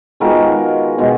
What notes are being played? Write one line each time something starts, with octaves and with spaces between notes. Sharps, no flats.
D#3 G#3 B3 F4 F#4 A#4
B2 G#3 D#4